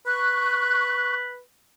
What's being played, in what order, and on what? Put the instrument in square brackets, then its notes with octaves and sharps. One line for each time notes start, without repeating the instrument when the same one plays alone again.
[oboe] B4 [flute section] C#6 F#6